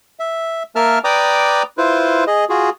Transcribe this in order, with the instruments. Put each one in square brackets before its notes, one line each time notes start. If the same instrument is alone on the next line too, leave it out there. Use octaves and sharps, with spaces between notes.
[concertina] E5
A#3 A#4 E5 A5 F6
B4 D5 G5 A#5 D6 D#6
E4 F4 B4 C5
G#4 D#5
F4 F#4 G#4